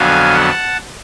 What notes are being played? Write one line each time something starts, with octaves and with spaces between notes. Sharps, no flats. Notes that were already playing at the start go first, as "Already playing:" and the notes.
Already playing: F2 D3 F#3 B3 F5 G#5
F#5 A5